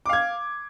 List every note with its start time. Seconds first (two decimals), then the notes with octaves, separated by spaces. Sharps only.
0.06 D6
0.09 F5
0.13 G#6